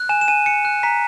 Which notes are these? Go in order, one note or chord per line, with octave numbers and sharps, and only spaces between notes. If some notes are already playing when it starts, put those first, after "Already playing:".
Already playing: F#6
G#5 E7
E7
G#5 D#7
G#5 C#7
F#6
A#5 B6